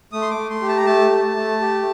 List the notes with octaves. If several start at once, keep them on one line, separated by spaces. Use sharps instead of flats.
A3 D#6
C6
D6
A3
C6
G4
A5
A#5
A3 A5
A3
A3
G4